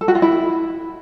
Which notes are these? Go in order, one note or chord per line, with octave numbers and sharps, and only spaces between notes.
A4
F#4
F4
E4